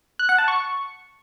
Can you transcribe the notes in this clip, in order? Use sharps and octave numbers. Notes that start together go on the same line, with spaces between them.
F#6
F#5
A5
C#6